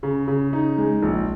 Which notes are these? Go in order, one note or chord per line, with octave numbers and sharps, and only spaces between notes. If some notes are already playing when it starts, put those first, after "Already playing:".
C#3
C#3
D#4
G#3
A#1